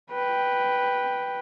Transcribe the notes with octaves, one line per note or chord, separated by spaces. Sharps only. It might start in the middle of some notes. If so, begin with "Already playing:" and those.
B4 G5